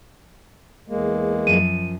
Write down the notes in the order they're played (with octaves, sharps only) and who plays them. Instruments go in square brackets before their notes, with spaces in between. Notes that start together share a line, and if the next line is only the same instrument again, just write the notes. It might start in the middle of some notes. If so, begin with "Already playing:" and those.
[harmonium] E2 G#3 A#3
[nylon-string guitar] F#2 F3 [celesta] D#7